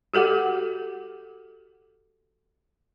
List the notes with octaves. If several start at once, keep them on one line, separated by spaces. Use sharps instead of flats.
F#4 G4 A4 F#5 D6